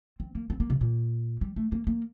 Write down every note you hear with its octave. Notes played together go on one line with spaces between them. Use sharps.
C4
A#3
C4
A#3
C3
A#2
G3
A3
A#3
A#3